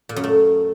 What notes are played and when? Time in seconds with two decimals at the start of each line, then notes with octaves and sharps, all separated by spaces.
0.09 A#2
0.16 F#2
0.24 A3